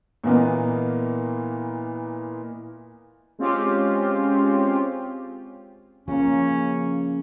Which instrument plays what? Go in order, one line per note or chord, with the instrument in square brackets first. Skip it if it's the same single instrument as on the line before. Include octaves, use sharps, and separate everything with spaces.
[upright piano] A#2 E3 A#3 B3 D#5
[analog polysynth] G#3 C4 C#4 F4 G4
[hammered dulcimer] C#3 A#3 [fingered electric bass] F3 [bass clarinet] C#4